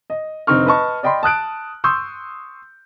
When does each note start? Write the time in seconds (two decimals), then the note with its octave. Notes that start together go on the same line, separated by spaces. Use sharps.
0.10 D#5
0.47 F1 D3 C4 D#4 C#6 F6
0.66 B4 D#5 A5 C#6
1.03 D5 D#5 G5 B5 C6
1.23 A5 D#6 F#6 D7
1.84 C6 C#6 D#6 E6 G6